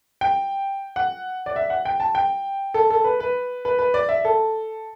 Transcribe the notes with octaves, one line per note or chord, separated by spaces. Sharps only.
G5
F#5
D5
E5
F#5
G5
A5
G5
A4
A4
B4
B4
B4
B4
D5
E5
A4